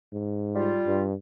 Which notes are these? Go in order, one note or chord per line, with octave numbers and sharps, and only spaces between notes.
G#2
G3 F4
G2